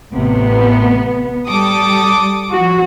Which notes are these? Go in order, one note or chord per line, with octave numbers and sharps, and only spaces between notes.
A1 A2 C3 B3
G3 A4 D6 D#6
F3 F#4